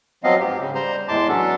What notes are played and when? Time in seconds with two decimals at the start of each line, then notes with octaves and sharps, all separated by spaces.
0.24 F3 F#3 B3 C4 D#5 F5
0.40 G#2 G4
0.60 C#3
0.75 G3 C5 A#5 C6
1.08 E2 A2 G#3 A5 C6 D6
1.28 F#3 B3 C#4 D4 A4